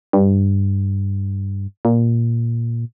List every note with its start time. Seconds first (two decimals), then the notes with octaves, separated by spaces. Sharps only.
0.13 G2
1.85 A#2